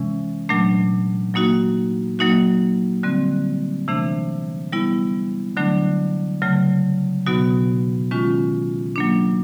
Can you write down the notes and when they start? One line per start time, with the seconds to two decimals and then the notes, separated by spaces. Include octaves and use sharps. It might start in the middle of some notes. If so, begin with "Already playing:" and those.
Already playing: C3 E3 G#3 C#4
0.49 A#2 F#3 A3 D4
1.34 F#3 A#3 D#4 F#4
2.19 F#3 A#3 D#4 F#4
3.03 D3 G3 C4
3.88 C3 E3 A3 D4
4.72 G3 B3 E4
5.57 D3 F#3 A3 D4
6.42 C#3 F#3 A3
7.26 B2 F#3 B3 D#4 F#4
8.11 D#3 G#3 C#4 F4
8.96 F#3 A#3 D4